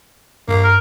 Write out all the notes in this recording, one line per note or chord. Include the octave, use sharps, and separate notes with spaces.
G2 A#3
A#4